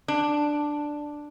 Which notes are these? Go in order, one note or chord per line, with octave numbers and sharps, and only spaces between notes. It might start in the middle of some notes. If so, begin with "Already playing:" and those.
D4